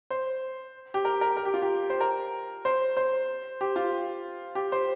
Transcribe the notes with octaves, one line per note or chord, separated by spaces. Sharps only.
C5
G4
A#4
A#4
A#4
G4
F4
G4
C5
A#4
C5
C5
G4
F4
G4
C5